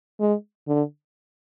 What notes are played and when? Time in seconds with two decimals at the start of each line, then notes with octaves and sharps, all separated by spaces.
0.20 G#3
0.68 D3